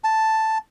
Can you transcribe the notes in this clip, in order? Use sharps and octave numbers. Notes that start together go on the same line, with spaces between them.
A5